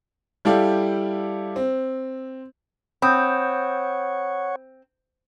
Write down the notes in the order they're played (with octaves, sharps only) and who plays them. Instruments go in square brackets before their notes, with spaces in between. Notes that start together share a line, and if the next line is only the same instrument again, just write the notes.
[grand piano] G3 E4 G4 A4 D5 F5
C4
[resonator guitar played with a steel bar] C4 [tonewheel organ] C#5 F#5 [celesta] B5 D#6 G6